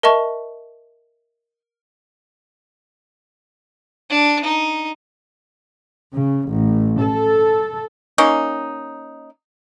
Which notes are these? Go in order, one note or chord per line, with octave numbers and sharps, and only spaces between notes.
A#4 D#5 E5 A5 C#6
D4
D#4
C#3
A1
A4
A#3 C#4 D#4